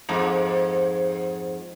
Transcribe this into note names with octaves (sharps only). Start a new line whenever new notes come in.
F2 G#2